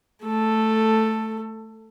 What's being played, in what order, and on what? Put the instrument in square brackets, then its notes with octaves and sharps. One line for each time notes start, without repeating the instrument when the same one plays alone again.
[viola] A3 A4